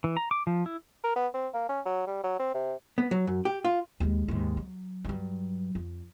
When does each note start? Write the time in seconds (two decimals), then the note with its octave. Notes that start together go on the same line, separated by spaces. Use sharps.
0.04 E3
0.17 A#5
0.31 D6
0.47 F3
0.66 E4
1.03 A#4
1.16 B3
1.34 C4
1.54 A#3
1.69 C#4
1.85 F#3
2.07 G3
2.24 F#3
2.39 C4
2.54 C3
2.98 B3
3.11 F#3
3.27 F#2
3.45 G4
3.65 F4
4.00 D#2 G#3
4.28 D#2 G#2
4.57 F#3
5.04 G2 F#3
5.75 F2